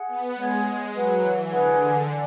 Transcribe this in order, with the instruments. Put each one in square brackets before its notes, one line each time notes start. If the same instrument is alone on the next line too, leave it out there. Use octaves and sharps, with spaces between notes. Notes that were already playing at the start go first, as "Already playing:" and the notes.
Already playing: [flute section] G#4 F#5
[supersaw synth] B3
[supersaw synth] G#3 [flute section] G#4 C#5 F#5
[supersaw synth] G#3
[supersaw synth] F#3 [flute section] G#4 B4 F#5
[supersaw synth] E3
[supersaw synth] D3 [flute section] G#4 B4 F#5
[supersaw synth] D3
[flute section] A4 D5 G#5